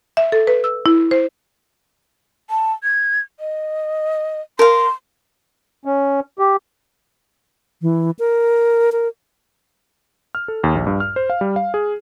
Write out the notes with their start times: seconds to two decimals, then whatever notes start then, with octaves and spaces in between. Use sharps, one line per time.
0.17 E5
0.32 A4
0.47 B4
0.64 E6
0.86 E4
1.11 C5
2.50 A5
2.83 G#6
3.40 D#5
4.59 A#4 F5 C6
5.85 C#4
6.39 G4
7.82 E3
8.19 A#4
8.92 A#4
10.35 F6
10.48 A4
10.64 D#2
10.75 A#1
10.87 G2
11.00 F6
11.16 C5
11.30 F5
11.41 G3
11.56 F5
11.74 G#4